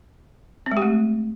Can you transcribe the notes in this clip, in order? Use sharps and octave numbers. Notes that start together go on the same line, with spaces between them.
C4
G#3
G4
A3